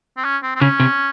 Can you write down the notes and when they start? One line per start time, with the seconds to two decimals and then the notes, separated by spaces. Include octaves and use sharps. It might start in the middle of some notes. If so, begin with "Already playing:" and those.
0.17 C4
0.24 C#4
0.43 C4
0.56 C4
0.61 C#3 C#4
0.80 C3